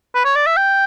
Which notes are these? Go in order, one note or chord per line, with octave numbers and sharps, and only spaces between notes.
B4
C#5
D5
E5
G5